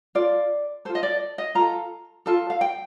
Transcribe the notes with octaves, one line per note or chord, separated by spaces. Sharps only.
F4 A4 D5
F4 A4 C5
D#5
D5
D#5
F4 A4 A#5
F4 A4 A5
F5
G5